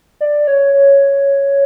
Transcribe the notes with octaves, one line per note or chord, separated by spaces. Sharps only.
D5
C#5
C#5